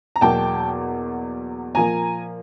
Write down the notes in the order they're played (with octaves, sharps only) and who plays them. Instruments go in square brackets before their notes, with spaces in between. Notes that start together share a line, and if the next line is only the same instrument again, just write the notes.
[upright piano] A#5
E2 B2 F#3 A#3 G5 A5
A#2 F3 A#3 G#5 A#5